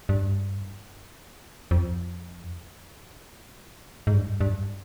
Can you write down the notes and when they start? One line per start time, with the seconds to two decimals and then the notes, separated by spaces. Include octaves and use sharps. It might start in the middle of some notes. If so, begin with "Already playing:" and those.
0.09 G2
1.71 F2
4.07 G#2
4.14 G2
4.41 G2